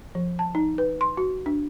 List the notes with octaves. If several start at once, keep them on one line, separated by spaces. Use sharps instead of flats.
F3
A5
D#4
B4
C6
F#4
D4